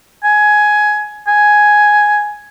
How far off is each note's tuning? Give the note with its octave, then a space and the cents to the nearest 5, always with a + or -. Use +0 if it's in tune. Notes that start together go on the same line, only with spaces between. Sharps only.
G#5 +15
G#5 +5